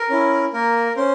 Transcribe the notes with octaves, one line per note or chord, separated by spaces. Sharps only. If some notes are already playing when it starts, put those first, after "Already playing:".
Already playing: A#4
C#4 E4
A#3 A#4
C#4 C5